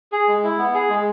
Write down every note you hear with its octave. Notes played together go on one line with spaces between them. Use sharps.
G#4
G#3
E4
B3
G#4
G#3